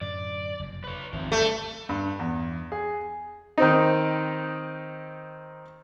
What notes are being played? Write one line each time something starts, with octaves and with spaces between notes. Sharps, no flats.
F#2 A2 D3 D5
F#1 F2 C3
B4 C#5
G#1 E2 C3 F3
G2 A3
G2
E2
G#4
D#3 C4 D#4